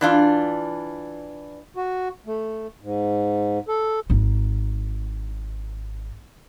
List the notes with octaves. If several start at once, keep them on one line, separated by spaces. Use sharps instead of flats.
E3 D4 F4
F#4
A3
G#2
A4
G#1 D#4